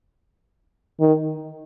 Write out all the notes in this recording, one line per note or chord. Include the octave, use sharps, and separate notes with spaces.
D#3